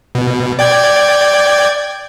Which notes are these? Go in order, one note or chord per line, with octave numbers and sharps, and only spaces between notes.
B2
D5 G5 G#6